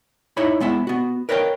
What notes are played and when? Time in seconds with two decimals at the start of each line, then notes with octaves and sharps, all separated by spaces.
0.37 D#4 E4 C#5 E5 B5
0.60 G#3 B3 E4 E5
0.87 B3 F#4
1.29 A#4 B4 C#5 D#5 F5 G5